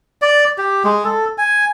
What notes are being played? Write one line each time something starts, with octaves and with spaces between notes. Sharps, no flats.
D5
G4
G#3
A4
G#5